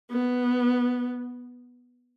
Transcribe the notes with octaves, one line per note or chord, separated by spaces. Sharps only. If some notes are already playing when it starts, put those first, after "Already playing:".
B3